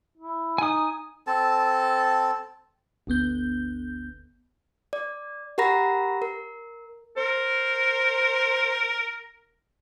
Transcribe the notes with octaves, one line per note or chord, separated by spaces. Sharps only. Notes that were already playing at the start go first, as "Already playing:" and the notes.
E4
D#4 G#5 D#6
C4 A4 A5
G1 D2 B3 G6
D5
G4 A#4 F#5 A#5 B5 A#6
A#4
A#4 C5